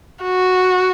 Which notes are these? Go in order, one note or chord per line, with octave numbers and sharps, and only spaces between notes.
F#4